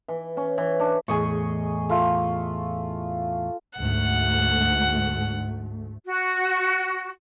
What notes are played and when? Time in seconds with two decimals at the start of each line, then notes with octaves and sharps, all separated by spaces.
0.08 E3
0.37 C#4
0.58 E3
0.80 D4
1.08 E2 A2 G#4 D#5 C#6
1.89 A3 F4
3.79 D2 G#2 A3 F#5
6.05 F#4